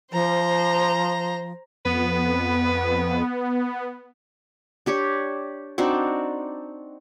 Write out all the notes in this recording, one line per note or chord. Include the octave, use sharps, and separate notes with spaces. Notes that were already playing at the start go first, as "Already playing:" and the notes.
F3 C5 A#5
F2 B3 B4
D4 G4 C#5
C4 D4 D#4 F#4